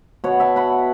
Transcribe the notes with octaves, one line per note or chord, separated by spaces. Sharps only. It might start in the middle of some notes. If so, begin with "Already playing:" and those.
B2 B3 C#5 F#5
E5 A5
F#5 B5